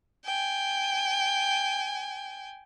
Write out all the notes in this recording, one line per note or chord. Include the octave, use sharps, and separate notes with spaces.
G5 G#5